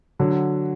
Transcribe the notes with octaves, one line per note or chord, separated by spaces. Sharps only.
D3 F#3